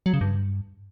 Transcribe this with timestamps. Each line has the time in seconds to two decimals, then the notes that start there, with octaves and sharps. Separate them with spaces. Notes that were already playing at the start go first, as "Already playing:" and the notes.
0.06 F#3
0.13 C#3
0.21 G2